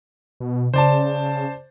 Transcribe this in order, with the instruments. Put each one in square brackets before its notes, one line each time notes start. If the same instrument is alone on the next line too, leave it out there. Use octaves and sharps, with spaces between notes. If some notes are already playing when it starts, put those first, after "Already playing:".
[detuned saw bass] B2
[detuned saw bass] C#3 [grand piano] C5 D5 A5